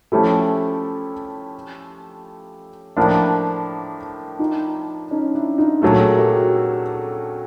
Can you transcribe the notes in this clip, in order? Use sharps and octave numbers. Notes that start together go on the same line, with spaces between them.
F3 A3 C#4 E4 F4 G4 A4
A2 F3 A#3 D4
D#4 F4
C#4 D#4
D4 E4
D#4 F4
A#2 F#3 A3 G4 A4
G#4 A#4
G4 A4
F#4 G#4